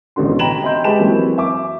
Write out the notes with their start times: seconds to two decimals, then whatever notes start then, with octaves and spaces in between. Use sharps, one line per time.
0.16 A1 B2 D3 F#4 C6
0.39 G5 A#5 B5 E7 F#7
0.63 D#5 E5 G5 C6 G6
0.84 G#3 G4 B4 A5 B5 E7
0.99 E3 F#3 A#3 C4
1.38 E5 D6